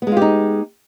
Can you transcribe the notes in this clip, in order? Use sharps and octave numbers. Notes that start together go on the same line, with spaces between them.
G#3 B3 D#4 F4 G4